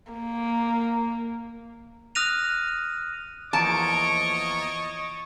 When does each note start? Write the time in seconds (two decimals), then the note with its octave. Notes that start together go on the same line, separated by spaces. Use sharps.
0.11 A#3
2.15 D#6 F6 F#6 A#6 D#7 F7
3.53 E2 F3 A#3 C#5 D#5 A5 C#6 D7